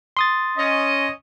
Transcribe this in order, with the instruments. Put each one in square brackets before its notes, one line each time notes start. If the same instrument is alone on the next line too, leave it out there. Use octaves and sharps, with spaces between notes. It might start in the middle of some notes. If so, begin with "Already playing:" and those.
[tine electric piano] C6 D#6 A6
[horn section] C#4 D#5